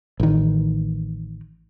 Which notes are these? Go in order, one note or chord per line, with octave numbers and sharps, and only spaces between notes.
A1 D#3